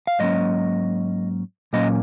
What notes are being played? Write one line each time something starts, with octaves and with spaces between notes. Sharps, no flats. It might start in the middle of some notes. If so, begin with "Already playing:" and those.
F5
G#2 F#3 A#3 C#4 D#5
A#2 F#3 A#3 C#4 D#5